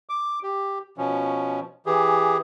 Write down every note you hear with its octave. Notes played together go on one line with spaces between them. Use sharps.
D6
G4
B2 F3 C#4
E3 G4 G#4